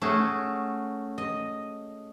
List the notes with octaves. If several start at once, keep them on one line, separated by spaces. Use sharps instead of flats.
A3 C#4 F#4 G#4
D#5